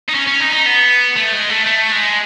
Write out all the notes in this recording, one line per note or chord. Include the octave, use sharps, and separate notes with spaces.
D#4
C#4
C#4
D#4
D#4
B3
A3
G#3
A3
A3
G#3